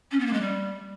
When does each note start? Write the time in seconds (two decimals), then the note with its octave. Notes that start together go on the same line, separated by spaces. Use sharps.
0.11 C#4
0.19 B3
0.26 A#3
0.33 G#3
0.41 G3